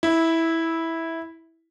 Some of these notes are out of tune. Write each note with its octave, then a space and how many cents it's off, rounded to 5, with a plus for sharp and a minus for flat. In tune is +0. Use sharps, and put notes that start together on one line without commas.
E4 -10